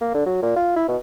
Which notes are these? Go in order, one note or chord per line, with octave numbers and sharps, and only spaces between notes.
A#3
D3
F#3
A#2
F4
E4
B2